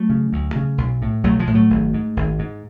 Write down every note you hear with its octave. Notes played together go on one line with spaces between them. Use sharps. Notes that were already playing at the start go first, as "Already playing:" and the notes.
Already playing: F#3 A3
C#3
D2
C#3
B1
A2
B1 F#3 A3
F3 G#3
A2
F#3 A3
G#1
G#2
G#1
G#2